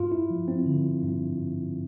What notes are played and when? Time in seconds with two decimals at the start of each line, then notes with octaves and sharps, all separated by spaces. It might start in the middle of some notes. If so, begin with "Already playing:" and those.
Already playing: G2 F4
0.12 E4
0.30 F3
0.48 C4
0.66 D3
1.03 G2